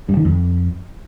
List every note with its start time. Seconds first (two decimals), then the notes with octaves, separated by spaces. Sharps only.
0.09 G2
0.17 D#3
0.25 F2